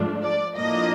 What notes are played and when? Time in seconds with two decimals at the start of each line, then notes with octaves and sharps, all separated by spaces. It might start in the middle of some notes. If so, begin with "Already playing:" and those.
Already playing: G#2 F3 A3 D4 F4
0.23 D5
0.55 A2 F3 A#3 D4 F4 D#5